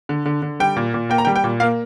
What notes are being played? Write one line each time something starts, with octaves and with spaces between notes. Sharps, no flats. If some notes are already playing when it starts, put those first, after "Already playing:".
D3
D3
D3
G3 G5
A#2
A#2
A#3 G5
A#5
G3 G5
G5
A#2
A#3 F5